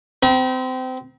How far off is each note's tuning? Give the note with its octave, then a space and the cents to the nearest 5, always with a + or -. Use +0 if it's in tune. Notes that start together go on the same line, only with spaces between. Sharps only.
C4 -25 A#5 +45